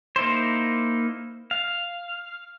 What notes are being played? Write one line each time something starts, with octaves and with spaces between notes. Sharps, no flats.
A#3 D#4 E4 C5
F5